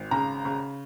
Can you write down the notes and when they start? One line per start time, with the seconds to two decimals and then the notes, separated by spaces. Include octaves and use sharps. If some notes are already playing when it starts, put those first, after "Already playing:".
Already playing: G#1
0.11 C#3 A#5
0.45 C#3